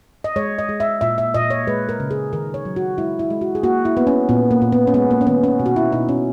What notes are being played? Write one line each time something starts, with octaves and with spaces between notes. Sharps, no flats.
D#5
G#3 C#5
D#5
G#3
E5
A#2 E5
E5
A#2 D#5
C#5
G#3 B4
A#4
C#3
G#4
D#3 A#4
C#5
F#3
F#4
G#3 E4
E4
G#3
F#4
G#4
A#3 F#4
E4
A#3 B3
C#4
A#2 B3
A#3
A#2
B3
C#4
G#3 B3
A#3
C#4
D#3 B3
C#4
B2
F#4
E4
B2 D#4
C#4